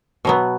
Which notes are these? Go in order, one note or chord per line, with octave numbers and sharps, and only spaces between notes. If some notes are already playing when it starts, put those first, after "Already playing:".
B2 F#3 B3